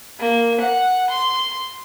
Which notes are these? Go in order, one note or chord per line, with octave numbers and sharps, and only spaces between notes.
A#3
F#5
C6